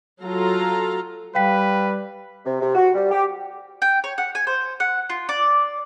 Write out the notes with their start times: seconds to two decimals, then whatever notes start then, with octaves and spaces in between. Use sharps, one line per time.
0.23 F#3 F4 A4 F5 A#5
1.35 G3 B4 F5 G5 B6
2.45 C3
2.60 C3
2.75 F#4
2.95 G3
3.12 G4
3.82 G5
4.04 C#5
4.18 F#5
4.35 G#5
4.47 C5
4.80 F#5
5.10 F4
5.29 D5